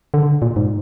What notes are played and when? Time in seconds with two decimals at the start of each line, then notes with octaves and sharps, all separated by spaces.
0.14 D3
0.42 A#2
0.56 G#2